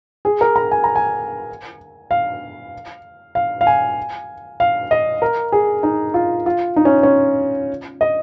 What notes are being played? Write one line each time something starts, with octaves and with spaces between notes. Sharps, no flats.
G#4
A#4
A#5
G#5
A#5
G#5
F5
F5
F5
G#5
F5
D#5
A#4
G#4
D#4
F4
F4
D#4
C#4
C#4
D#5